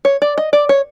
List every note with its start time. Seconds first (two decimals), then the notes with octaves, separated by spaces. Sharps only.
0.05 C#5
0.22 D5
0.38 D#5
0.53 D5
0.69 C#5